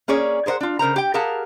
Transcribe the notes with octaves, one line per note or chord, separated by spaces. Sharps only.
A#3 C#4 G#4 C#5 D5
G#4 A#4 C5 D#5 F#5
D4 F4
C#3 A#4 C5 A#5
G4 G5
G4 G#4 A#4 F5 F#5 A5